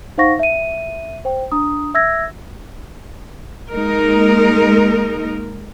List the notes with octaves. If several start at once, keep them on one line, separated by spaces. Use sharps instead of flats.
D#4 C5 F5 F#5 C#6 A#6
E5 D#7
C5 G5
D4 A#5 D#6
E5 E6 G#6 A#6
G#3 A#3 D#4 A#4